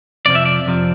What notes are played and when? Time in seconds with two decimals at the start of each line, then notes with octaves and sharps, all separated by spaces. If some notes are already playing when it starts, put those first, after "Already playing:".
0.26 F2 C3 F3 D5
0.35 E5
0.45 D5
0.66 F2 C3 F3